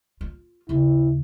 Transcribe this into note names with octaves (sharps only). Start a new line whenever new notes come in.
F4
D#2 C#3 E4